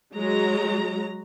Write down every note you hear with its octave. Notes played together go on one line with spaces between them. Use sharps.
F#3 G#3 A#5